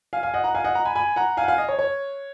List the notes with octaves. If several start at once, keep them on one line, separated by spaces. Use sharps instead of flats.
F5 G#5
F5 G#5
D#5 F#5
F#5 A#5
F5 G#5
D#5 F#5
F#5 A#5
G#5 B5
G#5 B5
F#5 A#5
F5 G#5
F#5
F5 G#5
D#5
C#5
C#5